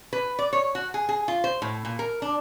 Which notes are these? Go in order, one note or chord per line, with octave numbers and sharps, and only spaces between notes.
B4
D5
C#5
F#4
G#4
G#4
F4
C5
A2
A#2
A#4
D4